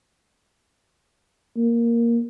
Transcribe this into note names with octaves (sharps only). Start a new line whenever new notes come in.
A#3